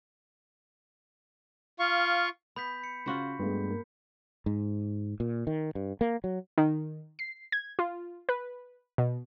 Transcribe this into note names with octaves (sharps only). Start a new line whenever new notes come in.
F4 F5 C#6
B3 B5 G6 B6
C#7
C#3 F4 F#4 C5
G2 G#3 A3 B3
A#3
G#2
A#2
D#3
G2
A#3
F#3
D#3
C7
G#6
F4
B4
B2